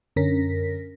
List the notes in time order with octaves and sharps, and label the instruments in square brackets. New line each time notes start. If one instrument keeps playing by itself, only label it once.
[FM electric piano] F#2 D3 C#4 A#4 A#6 B6